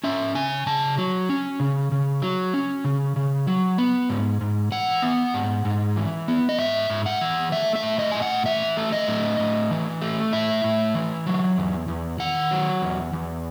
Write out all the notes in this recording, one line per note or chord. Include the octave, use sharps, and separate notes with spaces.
C#4 E5
C#3 G#5
C#3 A5
F#3
C#4
C#3
C#3
F#3
C#4
C#3
C#3
F#3
B3
G#2
G#2
E3 F#5
B3
G#2
G#2
E3
B3
D#5
G#2 E5
G#2
F#5
E3
A3 E5
E5
A2
D#5
A2 G#5
F#5
E3 E5
A3
D#5
A2
A2
E3
A3
A2 E5
A2
E3
F#3
E2
E2
D#3 F#5
F#3
E2
E2